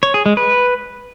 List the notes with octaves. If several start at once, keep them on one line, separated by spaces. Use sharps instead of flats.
C#5
G#4
G#3
B4